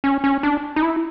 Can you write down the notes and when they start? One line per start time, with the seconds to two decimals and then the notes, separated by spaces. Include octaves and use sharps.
0.04 C#4
0.24 C#4
0.43 D4
0.76 D#4
0.82 E4